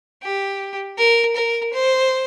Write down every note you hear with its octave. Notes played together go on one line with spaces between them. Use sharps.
G4
A#4
A#4
C5